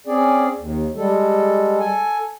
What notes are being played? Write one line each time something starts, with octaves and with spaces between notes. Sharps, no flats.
C4 C#4 G#4 D5
D#2
G3 G#3 A4
A4 G#5